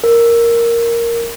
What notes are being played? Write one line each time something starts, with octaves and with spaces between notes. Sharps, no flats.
A#4